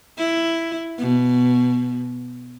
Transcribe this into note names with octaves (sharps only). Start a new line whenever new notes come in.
E4
B2